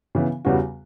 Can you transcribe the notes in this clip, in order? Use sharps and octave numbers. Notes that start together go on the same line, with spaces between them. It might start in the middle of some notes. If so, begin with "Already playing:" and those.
C#3 E3 B3
E2 C#3 G3 B3 F#4